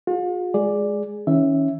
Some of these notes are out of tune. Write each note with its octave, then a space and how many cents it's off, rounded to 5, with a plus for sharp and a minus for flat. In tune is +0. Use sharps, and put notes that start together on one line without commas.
F4 +45 G#4 -15
G#3 +0 G#4 +0 D5 +0
E3 -45 C#4 +0 E5 +0